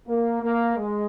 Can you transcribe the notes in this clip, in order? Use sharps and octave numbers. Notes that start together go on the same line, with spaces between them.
A#3
A#3
G#3